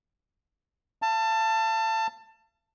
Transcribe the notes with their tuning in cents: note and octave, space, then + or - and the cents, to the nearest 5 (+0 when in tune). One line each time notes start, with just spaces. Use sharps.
F5 -45 A5 +20